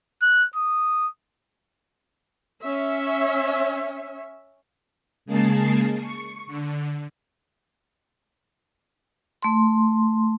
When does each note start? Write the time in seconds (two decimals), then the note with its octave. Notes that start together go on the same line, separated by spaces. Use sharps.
0.22 F#6
0.56 D#6
2.62 C#4 E5
5.26 C#3 G#3 A#3 G#4 A5 C7
6.01 C#6
6.47 D3
9.43 A3 C6